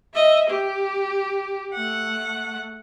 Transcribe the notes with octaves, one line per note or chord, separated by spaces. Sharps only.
D#5 E5
G4
A3 F#5